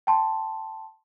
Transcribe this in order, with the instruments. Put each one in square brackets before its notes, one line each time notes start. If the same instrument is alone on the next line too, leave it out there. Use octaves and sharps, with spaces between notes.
[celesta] G5 A5 C6